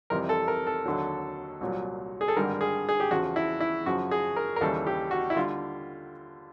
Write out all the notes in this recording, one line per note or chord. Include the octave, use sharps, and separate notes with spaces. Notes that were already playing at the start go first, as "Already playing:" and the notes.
F2 C3 E3 G3 A#4
A4
A#4
A4
D#2 D3 F#3
C2 A#2 F#3
G#4
A4
G#1 G2 D3 G3 A#4
G#4
G#4
G4
E2 C#3 F3 F#4
E4
E4
F#2 C#3 F3 F#4
G#4
A#4
A#4
D#2 C#3 E3 G3 A4
G4
F#4
E4
D3 G3 F4